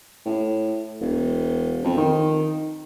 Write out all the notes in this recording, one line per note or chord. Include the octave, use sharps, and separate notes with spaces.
A2
E1
F2
D#3